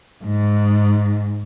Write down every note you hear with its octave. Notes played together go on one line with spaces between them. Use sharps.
G#2